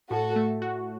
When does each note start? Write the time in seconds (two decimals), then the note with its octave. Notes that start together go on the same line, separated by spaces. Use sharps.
0.11 A2 F#4 A4
0.36 A3
0.62 F#4